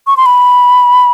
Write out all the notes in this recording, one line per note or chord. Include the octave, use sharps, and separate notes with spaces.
C#6
C6
B5